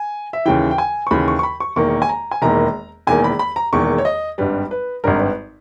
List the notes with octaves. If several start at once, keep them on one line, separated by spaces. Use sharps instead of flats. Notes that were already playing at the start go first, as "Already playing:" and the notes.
Already playing: G#5
E5
D#2 C#3 E3 G5
G5
G#5
C#6
D#2 C#3 E3 B5
C#6
C#6
B5
C#6
E1 E2 D#3 A#3 C#6
G#5
A#5
G#5
E1 E2 D#3 A#3 A#5
E1 E2 D#3 A#3 G#5
B5
B5
A#5
E1 E2 D#3 A#3 C#6
C#5
D#5
G#1 G2 G3 B4
B4
G#1 G2 G3 A#4
B4